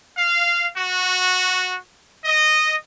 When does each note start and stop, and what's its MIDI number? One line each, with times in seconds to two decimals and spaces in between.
0.17 0.69 77
0.76 1.75 66
2.25 2.75 75